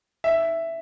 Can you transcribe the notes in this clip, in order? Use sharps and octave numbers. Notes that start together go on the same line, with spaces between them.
E5